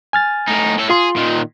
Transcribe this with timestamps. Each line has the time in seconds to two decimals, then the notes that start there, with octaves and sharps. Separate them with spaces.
0.13 G#5 F6 A6
0.48 A2 D#4
0.78 A2 A4
0.90 F4 G#4 C6
1.16 A#2 D#3